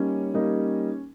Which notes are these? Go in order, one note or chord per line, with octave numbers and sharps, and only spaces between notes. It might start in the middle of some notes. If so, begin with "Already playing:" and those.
Already playing: G3 A#3 C#4 D#4
G3 A#3 D#4